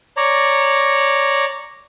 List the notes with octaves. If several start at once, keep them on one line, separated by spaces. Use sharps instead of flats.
C#5 D5 A#5